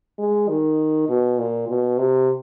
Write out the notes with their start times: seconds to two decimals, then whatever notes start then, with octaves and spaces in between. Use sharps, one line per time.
0.18 G#3
0.49 D#3
1.09 B2
1.39 A#2
1.68 B2
1.98 C3